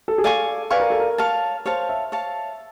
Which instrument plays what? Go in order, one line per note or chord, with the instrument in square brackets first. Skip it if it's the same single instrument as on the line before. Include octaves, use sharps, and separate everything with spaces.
[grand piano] A4
G#4
[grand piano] A4 [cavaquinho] D5 F5 G#5 C#6
[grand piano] B4 [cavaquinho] D5 F5 G#5 C#6
[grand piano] A#4
A4
A#4
[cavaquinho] C#5 F5 A5
[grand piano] C5 [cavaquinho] C#5 F5 A5
[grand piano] E5
[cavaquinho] C#5 F5 A5